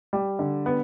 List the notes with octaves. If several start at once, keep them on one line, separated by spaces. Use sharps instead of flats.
G3
D3
B3